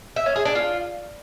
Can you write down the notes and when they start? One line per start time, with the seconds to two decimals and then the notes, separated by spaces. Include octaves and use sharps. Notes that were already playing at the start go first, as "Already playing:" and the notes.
0.16 E5
0.26 C#4
0.36 G#4
0.45 D4
0.55 F4